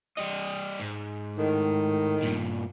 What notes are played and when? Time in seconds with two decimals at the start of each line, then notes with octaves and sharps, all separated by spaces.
0.17 G3 D#5
0.80 G#2
1.36 A2 D#3
2.23 G2 A#2